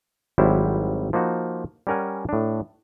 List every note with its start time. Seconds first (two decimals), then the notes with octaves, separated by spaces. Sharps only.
0.38 G#1 F#3 G3 E4 C5
1.13 F3 A#3 D#4 F#4
1.87 G3 C#4 A#4 F#5 G#5
2.29 A2 D4